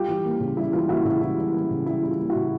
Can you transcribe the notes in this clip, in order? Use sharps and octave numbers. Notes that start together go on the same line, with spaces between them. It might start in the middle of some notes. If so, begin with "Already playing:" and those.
Already playing: G3 F4 G4
E3
A#3
C#3
G3 E4
E3 F4
A#3 E4 F#4
C#3 E4
G3 E4
E3
A#3
C#3
G3 E4
E3
F4
A#3
E4 F#4
C#3